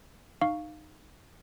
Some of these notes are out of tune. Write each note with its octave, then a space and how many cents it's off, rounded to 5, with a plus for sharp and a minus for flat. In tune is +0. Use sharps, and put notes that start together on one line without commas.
D#4 -20 F5 +0 C#6 +0